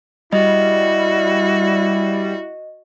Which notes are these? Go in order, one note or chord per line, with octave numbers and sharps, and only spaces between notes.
G3 E4 F#4 D#5